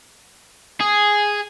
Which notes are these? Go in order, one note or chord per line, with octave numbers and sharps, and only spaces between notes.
G#4